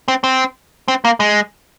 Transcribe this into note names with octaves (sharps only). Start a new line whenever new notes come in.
C4
C4
C4
A#3
G#3